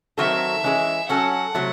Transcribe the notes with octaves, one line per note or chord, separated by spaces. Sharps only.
D#3 F#3 C4 F#4 A4 E5
E3 G#3 C#4 E4 G#4
F#3 C#4 F#4 A4 F#5
C3 F#3 A3